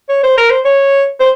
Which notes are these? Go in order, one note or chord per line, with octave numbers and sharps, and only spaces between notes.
C#5
C5
A#4
C5
C#5
C5